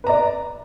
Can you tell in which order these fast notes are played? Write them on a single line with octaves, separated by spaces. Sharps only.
B4 A#5 D5